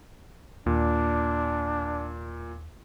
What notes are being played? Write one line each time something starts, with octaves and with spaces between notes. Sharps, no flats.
D#2 A#2 D4